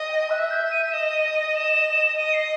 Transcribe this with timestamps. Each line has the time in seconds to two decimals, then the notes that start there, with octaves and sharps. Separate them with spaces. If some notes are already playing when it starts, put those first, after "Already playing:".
Already playing: D#5
0.09 G5
0.30 E5 F#6
0.51 G6
0.71 D#7
0.86 D#7
0.92 D#5 E7
1.13 D#7
1.34 D#7
1.55 E7
2.17 D#5 D#7
2.33 C7